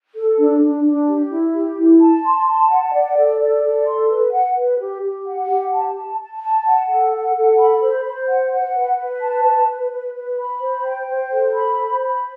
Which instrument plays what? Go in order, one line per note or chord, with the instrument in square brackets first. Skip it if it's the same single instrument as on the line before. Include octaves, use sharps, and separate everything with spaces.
[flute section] A4
D4
D4
D4
G4
E4
G4
E4
A5
C6
A5
F#5
D5
A4
D5
A4
C6
B4
F#5
B4
G4
G4
F#5
G4
A5
A5
A5
A5
F#5
A4
F#5
A4
B5
C5
C5
F#5
F#5
B4
B4
A5
B4
B4
B4
B4
B5
C5
G5
C5
A4
B5
C5
B5